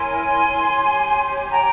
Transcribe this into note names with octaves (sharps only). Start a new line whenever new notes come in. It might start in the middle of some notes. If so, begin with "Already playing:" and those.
Already playing: E4 A#4 C#5 G#5 C6
G4 C#5
G5 A#5